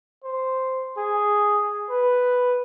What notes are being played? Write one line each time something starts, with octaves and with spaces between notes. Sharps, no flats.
C5
G#4
B4